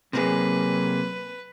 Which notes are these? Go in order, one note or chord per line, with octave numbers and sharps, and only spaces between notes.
C3 F#3 A#3 G#4 B4